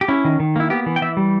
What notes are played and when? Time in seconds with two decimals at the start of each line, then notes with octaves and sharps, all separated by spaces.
0.01 G4
0.08 C#4 E4
0.25 D#3
0.40 D#3
0.56 A#3 E4
0.70 B3 G4
0.86 E3
0.96 G5
1.02 E3 E5
1.17 G3